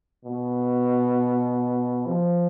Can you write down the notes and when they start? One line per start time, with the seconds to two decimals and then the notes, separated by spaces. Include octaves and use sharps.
0.25 B2
2.07 F3